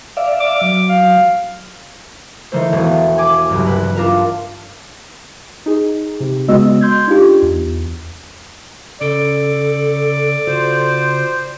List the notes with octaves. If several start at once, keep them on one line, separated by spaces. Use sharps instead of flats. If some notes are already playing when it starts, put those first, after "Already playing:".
D5 E5 F5
D6
F#3
F5
D#3 E3 A3 C5
E1
G#5 D6
F#1 C2 G2
B4
D4 F4 A#4
D#4 G#4
C3
C#3 G#3 B3 F#4 D#5 E6
C6 G6 G#6
D4 D#4 F4 G4
E2
C#3 A4 D5
C#3 F4 F#4 C5